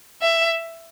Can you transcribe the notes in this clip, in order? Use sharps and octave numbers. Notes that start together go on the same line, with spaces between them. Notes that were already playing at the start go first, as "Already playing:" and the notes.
E5